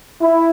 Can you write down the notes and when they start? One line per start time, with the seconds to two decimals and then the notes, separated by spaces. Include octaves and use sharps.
0.20 E4